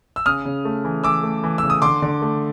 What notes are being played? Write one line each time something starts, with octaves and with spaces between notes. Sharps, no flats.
E6
C#3 D#6 F6
C#3
A3
E3
E3 D6 E6
A3
E3
C#3 E6
D#6
D3 C6 D6
D3
A3